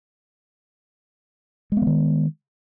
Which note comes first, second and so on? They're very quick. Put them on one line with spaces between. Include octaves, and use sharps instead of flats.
G#3 B3 E3 D#3